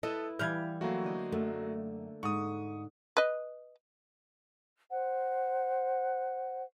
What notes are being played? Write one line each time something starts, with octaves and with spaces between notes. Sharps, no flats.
E4 A4 B4 D#5 A5
E3 G3 F5 G6 G#6
F#3 A3 A#3 F#4 C5
D3 D#5
F#2 A3
G#2 C#6 D#6
B4 D#5
C5 F#5